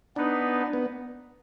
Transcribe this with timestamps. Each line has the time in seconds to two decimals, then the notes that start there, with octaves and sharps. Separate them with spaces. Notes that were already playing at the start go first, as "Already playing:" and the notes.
0.16 B3 D4 D#4 B4
0.73 B3